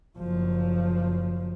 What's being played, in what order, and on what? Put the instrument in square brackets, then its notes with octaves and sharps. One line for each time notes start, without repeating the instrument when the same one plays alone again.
[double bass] F#1 F3